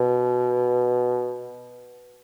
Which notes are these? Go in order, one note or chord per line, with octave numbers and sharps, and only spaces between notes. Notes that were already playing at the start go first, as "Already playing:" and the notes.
Already playing: B2